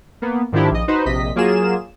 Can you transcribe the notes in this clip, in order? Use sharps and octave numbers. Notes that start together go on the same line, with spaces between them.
A#3 B3
G#2 D#3 F3 D4 E4 G4
A#1 D#5
D#4 F#4 B4 C5
A#1 C3 D#5 B6
F#3 A#3 F4 G#4 E7